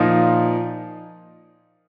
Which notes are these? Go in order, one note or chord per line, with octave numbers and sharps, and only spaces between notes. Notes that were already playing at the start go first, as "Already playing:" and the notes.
Already playing: A#2 F3 A#3 D#4